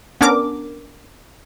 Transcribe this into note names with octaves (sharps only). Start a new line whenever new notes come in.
B3 C#4 D4 A#4 D6